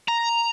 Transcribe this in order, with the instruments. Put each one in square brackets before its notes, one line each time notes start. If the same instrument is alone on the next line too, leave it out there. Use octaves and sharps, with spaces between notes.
[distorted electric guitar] A#5